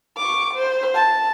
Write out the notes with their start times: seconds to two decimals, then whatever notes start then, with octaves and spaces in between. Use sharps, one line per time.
0.18 C#6 D6
0.54 C5
0.94 A5